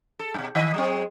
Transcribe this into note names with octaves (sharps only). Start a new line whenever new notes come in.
A4
G2 B2
D#3 D#5
F#3 G#3 C4